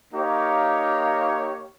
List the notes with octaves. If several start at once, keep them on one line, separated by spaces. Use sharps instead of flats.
A#3 D#4 G4 C#5 F5